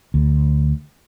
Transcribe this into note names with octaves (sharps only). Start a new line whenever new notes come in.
D2